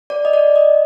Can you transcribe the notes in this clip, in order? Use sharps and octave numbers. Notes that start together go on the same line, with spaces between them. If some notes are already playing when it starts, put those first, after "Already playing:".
D5
D#5
D5
D#5